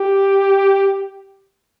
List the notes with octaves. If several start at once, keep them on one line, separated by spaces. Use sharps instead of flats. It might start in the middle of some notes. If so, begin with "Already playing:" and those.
Already playing: G4